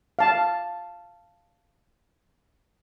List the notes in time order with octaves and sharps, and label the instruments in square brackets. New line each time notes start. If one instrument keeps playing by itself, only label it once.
[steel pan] F5 A5